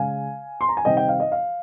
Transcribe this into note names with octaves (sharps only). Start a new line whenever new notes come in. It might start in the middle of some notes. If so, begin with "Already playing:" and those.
Already playing: C#3 G#3 F5 G#5
C6
A#5
G#5
C3 D#3 G3 C4 D#5 G5
D#5 G5
F5
D#5
F5